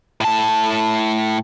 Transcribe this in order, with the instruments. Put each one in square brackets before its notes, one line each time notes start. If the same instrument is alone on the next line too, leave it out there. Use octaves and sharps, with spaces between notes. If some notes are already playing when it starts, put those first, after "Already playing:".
[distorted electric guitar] A2 A5